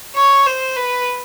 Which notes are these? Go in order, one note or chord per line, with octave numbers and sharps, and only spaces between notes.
C#5
C5
B4